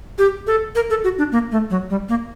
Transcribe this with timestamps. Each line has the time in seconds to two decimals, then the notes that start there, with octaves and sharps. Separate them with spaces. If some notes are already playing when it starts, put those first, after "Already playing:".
0.18 G4
0.47 A4
0.75 A#4
0.90 A4
1.04 F#4
1.18 D4
1.32 A#3
1.52 A3
1.70 F#3
1.90 G3
2.09 A#3